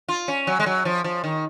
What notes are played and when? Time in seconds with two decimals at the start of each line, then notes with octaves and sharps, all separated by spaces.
0.09 F4
0.28 C#4
0.47 F#3
0.60 G#3
0.66 F#3
0.85 F3
1.04 F3
1.24 D#3